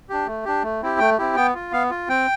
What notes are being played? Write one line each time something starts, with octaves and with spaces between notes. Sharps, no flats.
D4 G4
A3
D4 G4
A3
C4 E4 G4
A3 G5
C4 E4 G4
B3 G5
F4
B3 F5
F4
C4 G5